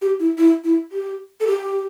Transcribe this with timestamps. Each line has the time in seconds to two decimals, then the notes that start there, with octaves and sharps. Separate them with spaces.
0.02 G4
0.20 E4
0.38 E4
0.64 E4
0.92 G4
1.40 A4
1.47 G4